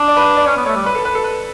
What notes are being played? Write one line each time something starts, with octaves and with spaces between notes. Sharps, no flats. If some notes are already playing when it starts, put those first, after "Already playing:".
Already playing: D4
D5
B4
D5
C#4 C#5
B3
A3 C#5
G3
B4
A4
B4
A4
B4